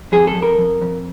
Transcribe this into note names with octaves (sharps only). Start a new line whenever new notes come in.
F2 G#4
A4
F2
A#4
F2
F2